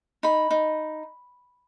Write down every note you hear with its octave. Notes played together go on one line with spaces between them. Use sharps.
D#4 B5
D#4